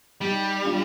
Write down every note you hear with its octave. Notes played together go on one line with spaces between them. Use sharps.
G3 D#4 G4
D4 F4